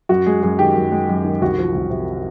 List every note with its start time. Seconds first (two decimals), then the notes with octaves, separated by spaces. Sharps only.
0.09 F#2 F#4
0.26 G#3 G#4
0.43 F#2 G#4
0.59 D#3 G4
0.76 F#2
0.92 G#3
1.09 F#2
1.25 D#3
1.41 C2 F#4
1.59 F3
1.75 C2
1.90 C3